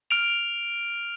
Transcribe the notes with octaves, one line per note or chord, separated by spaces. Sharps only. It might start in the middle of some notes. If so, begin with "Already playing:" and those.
F6 D7 F7